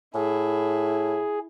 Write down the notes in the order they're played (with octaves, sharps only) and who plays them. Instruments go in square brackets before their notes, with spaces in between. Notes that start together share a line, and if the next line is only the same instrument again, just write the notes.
[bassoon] A2 [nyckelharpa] E4 [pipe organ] G#4